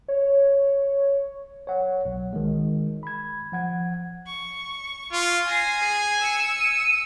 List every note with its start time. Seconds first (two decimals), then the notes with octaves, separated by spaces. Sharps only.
0.08 C#5
1.67 C#5 F#5
2.05 B1
2.33 D#3 G#3
3.03 B5 G#6
3.52 F3 F#5 G#6
4.27 C#6
5.13 F4
5.47 G#5 A#6 C7
5.79 G#4
6.20 E6 C#7
6.60 D#7